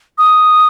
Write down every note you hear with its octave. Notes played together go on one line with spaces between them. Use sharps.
D#6